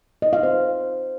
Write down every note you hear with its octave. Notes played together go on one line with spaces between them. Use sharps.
D#5
F5
C5